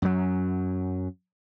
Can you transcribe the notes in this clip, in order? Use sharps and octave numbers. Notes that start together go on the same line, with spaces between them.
F#2 F#3